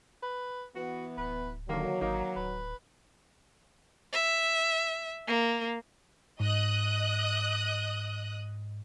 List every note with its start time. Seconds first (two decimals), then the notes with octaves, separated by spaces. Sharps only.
0.23 B4
0.76 E3 B3 F#4
1.17 D1 B4
1.69 D3 D#3 F#3 A#3
2.01 G#1 A#3 D#4
2.36 D1 B4
4.13 E5
5.27 A#3
6.40 G#2 D#5 D#6 F#6